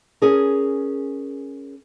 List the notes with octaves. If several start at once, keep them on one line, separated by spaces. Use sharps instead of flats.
C#4 G#4 A#4